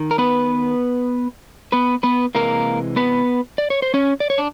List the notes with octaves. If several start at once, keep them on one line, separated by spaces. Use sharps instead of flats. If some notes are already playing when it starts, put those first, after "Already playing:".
Already playing: D#3
A#4
B3 B4
B3 B4
B3 B4
C3 E3 G#3 A#3 A#4
B3 B4
D5
C#5
C5
C#4 C#5
D5
C#5
D4